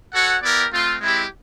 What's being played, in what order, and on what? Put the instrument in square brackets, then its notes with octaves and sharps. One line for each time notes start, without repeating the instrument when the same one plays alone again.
[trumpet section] F#4 A4 C#5 F#5
B3 E4 G4 A#4 D5
A3 C4 F4
G#3 C4 E4 G4